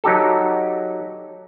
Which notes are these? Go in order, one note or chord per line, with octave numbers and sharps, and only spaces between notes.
F#3 D#4 G4 A4